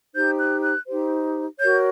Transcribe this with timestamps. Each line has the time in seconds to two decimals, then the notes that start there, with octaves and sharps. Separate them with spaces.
0.14 D#4 G4 C5 G6
0.39 F#6
0.63 F#6
0.87 D#4 G4 C5
1.60 F#4 A#4 C#5 G6